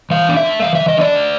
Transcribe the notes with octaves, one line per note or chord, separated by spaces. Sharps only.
E3 F5
D4
E5
A3
E3 F5
E5
E3
D#5
D4 D5
A3